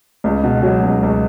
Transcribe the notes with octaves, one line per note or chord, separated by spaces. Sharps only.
C#2
B2
F#3
C#2
C#2